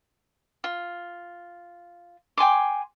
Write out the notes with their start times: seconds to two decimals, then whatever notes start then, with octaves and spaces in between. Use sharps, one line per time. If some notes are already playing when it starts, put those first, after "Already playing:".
0.64 F4
2.37 G5 G#5 C6 D6